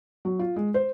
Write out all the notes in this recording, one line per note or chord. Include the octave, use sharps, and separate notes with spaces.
F#3
F4
G#3
C5